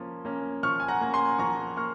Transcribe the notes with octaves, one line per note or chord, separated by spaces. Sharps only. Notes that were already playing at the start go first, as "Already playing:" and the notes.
Already playing: F3 A#3 C#4
A#3 C#4
F3 C#6 F6
G#5
F#5 A#5
A#3 C#4
G#5 C6
F3 A#5 C#6
A#3 C#6 F6